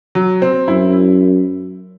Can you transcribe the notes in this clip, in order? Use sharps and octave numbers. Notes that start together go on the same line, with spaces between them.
F#3
C4
F#2 E4